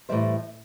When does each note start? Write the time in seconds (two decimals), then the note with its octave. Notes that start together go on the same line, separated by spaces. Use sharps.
0.09 A2 E3 G3 C5 E5